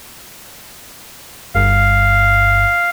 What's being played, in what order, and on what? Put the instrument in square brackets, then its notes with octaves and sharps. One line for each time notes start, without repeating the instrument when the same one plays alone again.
[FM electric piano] G1 G2 [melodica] F5